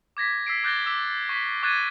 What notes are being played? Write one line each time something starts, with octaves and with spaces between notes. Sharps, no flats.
D6 G#6 A#6 B6
E6 B6 C7 D7
D6 F#6 G6 A6 A#6 G7
D6 E6 B6
C#6 B6
C#6 D6 F#6 G#6 A6 D#7